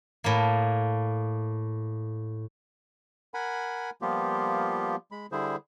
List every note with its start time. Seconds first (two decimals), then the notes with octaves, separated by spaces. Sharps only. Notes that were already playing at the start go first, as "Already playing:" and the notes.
0.24 A2 A#3
3.34 A#4 F#5 G#5 B5
4.02 F3 G3 A#3 B3 F4 G4
5.12 G#3 B5
5.32 D3 G3 E4 G#4 C5